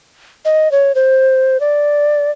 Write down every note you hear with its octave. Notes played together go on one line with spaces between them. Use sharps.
D#5
C#5
C5
D5